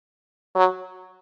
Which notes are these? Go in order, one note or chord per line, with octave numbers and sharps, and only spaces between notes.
F#3